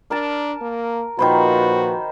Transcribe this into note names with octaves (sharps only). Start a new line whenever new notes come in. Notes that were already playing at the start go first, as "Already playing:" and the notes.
D4 A#4 A5
A#3
A#2 D#3 F3 F#4 B4 C5 B5